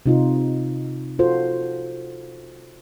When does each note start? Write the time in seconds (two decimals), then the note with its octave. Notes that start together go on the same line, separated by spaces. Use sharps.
0.06 C3 D#4 F4
1.19 F4 F#4 A4 C5